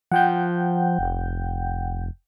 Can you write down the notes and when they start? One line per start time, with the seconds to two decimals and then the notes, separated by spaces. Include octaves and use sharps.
0.12 F3 F#5 G5 G6
0.99 F1